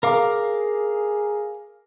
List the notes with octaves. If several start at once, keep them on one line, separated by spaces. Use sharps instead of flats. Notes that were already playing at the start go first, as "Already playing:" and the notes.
G#4 A#4 F5 D6